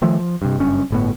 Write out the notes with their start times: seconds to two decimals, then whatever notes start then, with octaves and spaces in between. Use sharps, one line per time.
0.02 D#3 F3 A3
0.19 F3
0.42 G2 C3
0.58 F#1 G2 C#4
0.91 G1 A2 B3